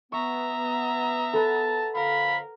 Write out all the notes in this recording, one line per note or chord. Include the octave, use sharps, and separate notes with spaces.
B3 E5 A#5 C#6
A4 B4 F#5 A5
F2 D3 A#4 F5 B5